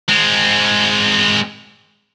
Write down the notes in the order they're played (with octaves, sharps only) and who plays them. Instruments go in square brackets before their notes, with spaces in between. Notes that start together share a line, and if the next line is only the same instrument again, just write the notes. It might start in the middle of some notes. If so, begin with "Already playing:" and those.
[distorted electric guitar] G#3 C4